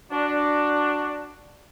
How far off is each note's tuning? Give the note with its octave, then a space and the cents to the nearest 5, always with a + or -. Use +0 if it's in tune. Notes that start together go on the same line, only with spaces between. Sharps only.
D4 +5 F#4 +0